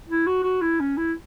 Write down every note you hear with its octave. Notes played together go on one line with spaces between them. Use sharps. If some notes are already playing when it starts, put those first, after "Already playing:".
E4
F#4
F#4
E4
C#4
E4